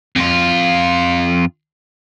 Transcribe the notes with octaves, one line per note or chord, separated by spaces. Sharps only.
F2 F4